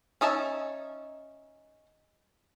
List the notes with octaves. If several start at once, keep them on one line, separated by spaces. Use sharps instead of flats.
C#4 D#4 E5 A5